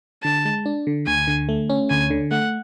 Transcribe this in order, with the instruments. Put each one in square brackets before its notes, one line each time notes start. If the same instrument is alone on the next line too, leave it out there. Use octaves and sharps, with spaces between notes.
[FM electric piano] D3 [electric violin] A5
[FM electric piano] G#3
D4
D3
[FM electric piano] D2 [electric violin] G#5
[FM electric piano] D3
A3
C#4
[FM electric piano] D2 [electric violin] G#5
[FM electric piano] D3
[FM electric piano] A3 [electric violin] F#5